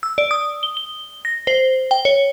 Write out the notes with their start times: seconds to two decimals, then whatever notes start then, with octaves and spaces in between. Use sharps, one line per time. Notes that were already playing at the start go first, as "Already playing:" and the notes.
0.03 E6
0.18 D5
0.31 D#6
0.63 G7
0.77 G7
1.25 A#6
1.47 C5
1.91 G5
2.05 C#5